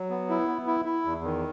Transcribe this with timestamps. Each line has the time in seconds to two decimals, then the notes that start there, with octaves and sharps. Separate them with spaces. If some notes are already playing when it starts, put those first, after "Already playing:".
Already playing: F#3
0.10 B3
0.29 E4
0.48 B3
0.67 E4
0.85 E4
1.05 E2
1.24 D#3